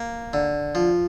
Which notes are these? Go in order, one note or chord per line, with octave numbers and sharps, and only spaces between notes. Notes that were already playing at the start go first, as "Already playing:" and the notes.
Already playing: A#3
D3
F3